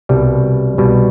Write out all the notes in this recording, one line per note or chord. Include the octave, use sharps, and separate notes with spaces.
C2 B2 G3
C2 B2 G3